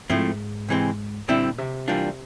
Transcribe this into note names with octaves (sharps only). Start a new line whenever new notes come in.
G#2 F3 A3 C4 E4
C3 E3 G#3 C4
A#2 D3 G3 C4 E4
C3
E3 G3 A#3 D4 F4